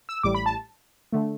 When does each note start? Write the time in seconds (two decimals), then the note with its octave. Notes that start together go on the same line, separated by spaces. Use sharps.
0.09 E6
0.23 A1 A2 G3 D6
0.35 B5
0.46 A5
1.12 D3 A3